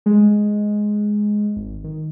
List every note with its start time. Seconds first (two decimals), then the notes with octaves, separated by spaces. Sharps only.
0.06 G#3
1.56 G#1
1.84 D#3